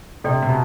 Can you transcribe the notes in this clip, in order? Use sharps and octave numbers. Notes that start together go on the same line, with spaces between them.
C3 D4 A4 D5 G5 C6
C3
B2